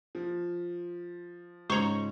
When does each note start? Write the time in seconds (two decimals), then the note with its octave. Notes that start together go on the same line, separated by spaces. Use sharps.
0.15 F3
1.70 G#2 C#3 C5 C#5 A#5 C#6